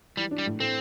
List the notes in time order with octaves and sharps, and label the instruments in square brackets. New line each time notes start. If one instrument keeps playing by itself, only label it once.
[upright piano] E3 [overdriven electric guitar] G3
[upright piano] D4
[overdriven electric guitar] G3
[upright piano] A2
[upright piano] A3 [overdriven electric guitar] C4